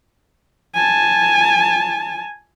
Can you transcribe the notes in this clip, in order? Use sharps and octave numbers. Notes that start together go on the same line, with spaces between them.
G#5 A5